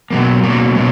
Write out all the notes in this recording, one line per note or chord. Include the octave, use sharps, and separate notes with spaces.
B2 F#3 A#3
B2 F#3 A#3
B2 F#3 A#3